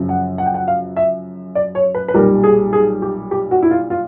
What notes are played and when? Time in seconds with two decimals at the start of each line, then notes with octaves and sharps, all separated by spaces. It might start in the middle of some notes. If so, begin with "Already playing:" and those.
Already playing: F#2 C#3 F3
0.09 F#5
0.38 F#5
0.46 G5
0.54 F#5
0.68 F5
0.97 E5
1.55 D5
1.75 C#5
1.95 B4
2.08 B4
2.14 B1 A#2 G3 A#4
2.44 G#4
2.73 G#4
3.02 G4
3.31 G4
3.51 F#4
3.62 E4
3.71 F4
3.90 F4